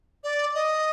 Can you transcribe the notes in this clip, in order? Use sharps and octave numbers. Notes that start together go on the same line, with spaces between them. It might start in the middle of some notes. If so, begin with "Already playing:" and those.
D5
D#5